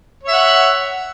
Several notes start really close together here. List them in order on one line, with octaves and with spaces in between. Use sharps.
C#5 E5 F#5